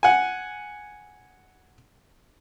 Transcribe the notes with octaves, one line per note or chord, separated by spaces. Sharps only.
F#5 G#5